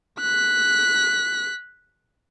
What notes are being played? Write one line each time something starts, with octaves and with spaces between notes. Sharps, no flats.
F#6 B6